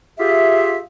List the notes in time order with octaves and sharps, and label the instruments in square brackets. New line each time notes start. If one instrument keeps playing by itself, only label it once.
[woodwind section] F4 G4 G#4 E5